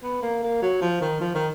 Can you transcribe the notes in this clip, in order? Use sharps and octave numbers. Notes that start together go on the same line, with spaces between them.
B3
A#3
A#3
F#3
F3
D#3
F3
D#3